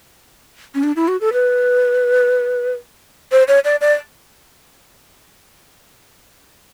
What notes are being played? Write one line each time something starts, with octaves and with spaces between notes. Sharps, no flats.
C#4
D4
E4
F#4
A4
B4
C5
C#5
D5
D5